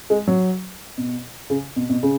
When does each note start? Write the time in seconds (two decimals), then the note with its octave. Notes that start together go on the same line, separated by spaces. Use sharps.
0.10 G#3
0.27 F#3
0.98 B2
1.50 C#3
1.76 B2
1.90 B2
2.03 C#3